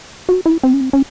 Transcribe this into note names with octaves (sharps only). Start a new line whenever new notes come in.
F#4
E4
C4
C#4
C4
C#4